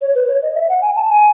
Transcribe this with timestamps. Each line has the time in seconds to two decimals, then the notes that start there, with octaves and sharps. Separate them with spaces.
0.01 C#5
0.15 B4
0.28 C#5
0.42 D#5
0.55 E5
0.69 F#5
0.82 G#5
0.96 A5
1.09 G#5